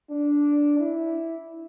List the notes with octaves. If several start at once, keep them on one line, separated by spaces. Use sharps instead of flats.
D4
E4